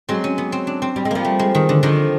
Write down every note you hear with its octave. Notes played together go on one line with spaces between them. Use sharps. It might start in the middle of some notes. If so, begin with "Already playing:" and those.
F#3 G#3 C4
C#4
B3
C4
D4
C4
G3
G#3
F3 G3 A#3
A3
G#3
D#3
D3
D3 D#3 F3